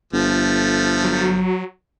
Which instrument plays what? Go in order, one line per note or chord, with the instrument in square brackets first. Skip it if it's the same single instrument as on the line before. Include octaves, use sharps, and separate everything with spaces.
[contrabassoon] G1 [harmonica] F3 A3
[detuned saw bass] F#3